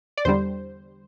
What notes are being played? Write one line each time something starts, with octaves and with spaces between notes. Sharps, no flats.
D5
E2 D3 G3 C5